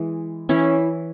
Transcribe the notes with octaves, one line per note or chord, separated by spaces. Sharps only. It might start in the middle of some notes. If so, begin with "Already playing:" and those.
Already playing: E3 G#3
E3 C#4 E4